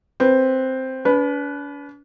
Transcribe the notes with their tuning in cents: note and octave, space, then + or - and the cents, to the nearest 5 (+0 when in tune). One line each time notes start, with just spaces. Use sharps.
C4 +0 B4 +0
D4 -45 B4 +0